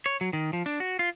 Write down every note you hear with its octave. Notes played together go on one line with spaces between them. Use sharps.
C#5
F#3
D#3
F3
D4
F#4
F4